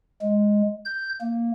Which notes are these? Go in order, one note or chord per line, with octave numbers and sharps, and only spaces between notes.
G#3
G6
A#3